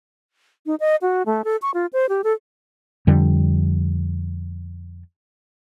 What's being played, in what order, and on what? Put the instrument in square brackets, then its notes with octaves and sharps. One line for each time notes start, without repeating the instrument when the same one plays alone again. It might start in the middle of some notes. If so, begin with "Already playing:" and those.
[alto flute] D#4
D#5
F#4
A3
A4
C#6
F4
C5
G4
A4
[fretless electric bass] F2 D3 G3